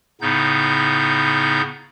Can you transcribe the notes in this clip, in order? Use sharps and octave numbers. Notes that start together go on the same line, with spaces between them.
A2 C#3 B3 D#4 G6